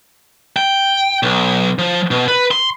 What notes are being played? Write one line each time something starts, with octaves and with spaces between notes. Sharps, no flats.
G5
B1
F3
B2
B4
C6